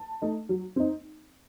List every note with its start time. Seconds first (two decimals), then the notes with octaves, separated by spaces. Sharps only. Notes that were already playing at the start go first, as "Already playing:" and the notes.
Already playing: A5
0.22 A3 D#4
0.49 F#3
0.76 C4 D#4